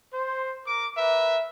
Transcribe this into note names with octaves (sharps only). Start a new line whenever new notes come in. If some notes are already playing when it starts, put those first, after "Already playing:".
C5
A#4 D6
A#4 B4 E5